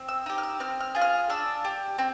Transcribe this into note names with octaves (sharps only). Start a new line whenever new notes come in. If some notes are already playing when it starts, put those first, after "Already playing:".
Already playing: C4
E6
D#4 G4
F6
E6
C4 F6
F6
F4 G#4
F6
D4 E6
G4
C4